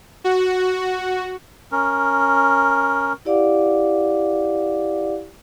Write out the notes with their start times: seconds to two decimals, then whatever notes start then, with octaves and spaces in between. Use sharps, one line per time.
0.24 F#4
1.72 C#4 A#4
3.25 E4 G4 D5 F5 F#5 D6